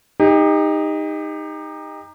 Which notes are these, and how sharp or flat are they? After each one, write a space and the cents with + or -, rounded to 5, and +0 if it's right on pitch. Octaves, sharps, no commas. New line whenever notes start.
D#4 +0 G4 +35